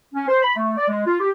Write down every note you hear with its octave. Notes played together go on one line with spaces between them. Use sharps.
C#4
C5
B5
A3
D5
G#3
F4
G4